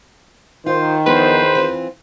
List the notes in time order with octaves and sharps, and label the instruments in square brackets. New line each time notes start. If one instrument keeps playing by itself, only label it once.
[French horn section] D#3 [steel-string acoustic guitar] F4 [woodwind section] C5
[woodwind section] E2 C5 [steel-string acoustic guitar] F3 B3 D4 [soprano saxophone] B4
[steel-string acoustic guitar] E3 C4 F4